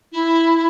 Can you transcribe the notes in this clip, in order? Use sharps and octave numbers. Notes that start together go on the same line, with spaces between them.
E4